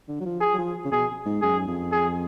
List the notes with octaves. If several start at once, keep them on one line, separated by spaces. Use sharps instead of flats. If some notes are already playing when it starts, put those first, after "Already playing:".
D3
F#3
F3
G#4
F#3
F3
C#3
B2 G#4
G#2
F#2 G#4
F2
G#4